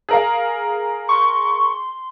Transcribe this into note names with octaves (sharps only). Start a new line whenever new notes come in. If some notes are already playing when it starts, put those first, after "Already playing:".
G#4 A#4 F5
C6 C#6